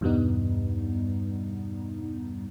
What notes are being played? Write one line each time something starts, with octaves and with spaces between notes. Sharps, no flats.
E2 G2 B2 G3 B3 D#4